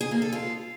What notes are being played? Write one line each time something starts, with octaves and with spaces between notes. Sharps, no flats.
G#4
A#3
A4
F4